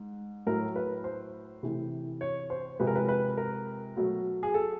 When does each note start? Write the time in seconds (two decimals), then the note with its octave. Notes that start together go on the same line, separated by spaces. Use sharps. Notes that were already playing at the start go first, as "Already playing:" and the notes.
Already playing: G#2
0.46 A2 F#3 A3 A#4
0.76 B4
1.04 C5
1.63 C3 E3 A3
2.21 C#5
2.50 C5
2.80 C3 F3 G#3 B4
2.87 A#4
2.95 B4
3.08 B4
3.38 A#4
3.96 B2 F#3 A3
4.43 G#4
4.54 A4